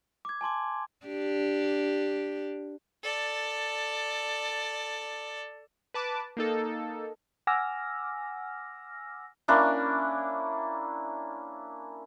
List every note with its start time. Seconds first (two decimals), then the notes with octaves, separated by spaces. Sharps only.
0.25 D6 G#6
0.41 G#5 A5 C6 D6
1.06 D4 G4
3.03 A4 D5
5.94 B4 A5 D6
6.37 A#3 D#4 A4
7.47 F#5 G#5 D6 E6 F6 A#6
9.48 A#3 C#4 D4 E4